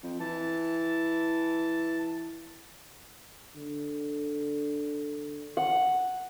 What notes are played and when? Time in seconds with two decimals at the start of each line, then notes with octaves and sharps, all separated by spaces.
0.03 F2
0.20 E3 A5
3.56 D3
5.57 F#5